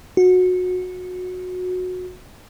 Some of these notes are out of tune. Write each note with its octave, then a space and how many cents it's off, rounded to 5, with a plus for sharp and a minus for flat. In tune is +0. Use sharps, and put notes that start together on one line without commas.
F#4 -20